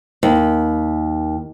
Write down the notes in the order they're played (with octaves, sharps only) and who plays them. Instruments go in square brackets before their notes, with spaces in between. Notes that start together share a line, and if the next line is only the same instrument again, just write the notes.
[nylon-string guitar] D#2